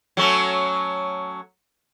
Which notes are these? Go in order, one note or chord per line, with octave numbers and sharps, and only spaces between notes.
F#3 A3 C#4